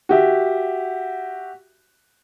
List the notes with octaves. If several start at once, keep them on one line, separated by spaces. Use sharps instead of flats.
F#4 G4 E5